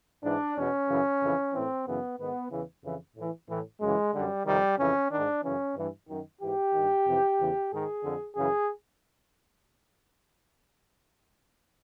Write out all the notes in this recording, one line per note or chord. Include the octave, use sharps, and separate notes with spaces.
G#2 E3 D4
E2 B2 C#4
F#2 C#3 E3
F2 C#3 E3
A2 E3 C4
F#2 C#3 E3 B3
G#2 D#3 B3
E2 C#3 E3
F2 C#3 E3
A2 E3
A2 E3
F#2 C#3 E3 G#3
F#2 D3 G3
F2 C3 D#3 G3
F2 C#3 E3 C#4
G#2 D#3 D4
F#2 C#3 E3 C#4
G2 E3
F#2 D#3
G#2 E3 G4
G2 D#3
F2 C3 E3
E2 C#3 E3
G#2 D#3 G#4
F2 D3
F#2 C#3 E3 G#4